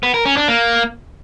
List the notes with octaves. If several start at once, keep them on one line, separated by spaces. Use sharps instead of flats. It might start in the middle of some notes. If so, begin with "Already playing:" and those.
B3
A#4
C#4
D4
A#3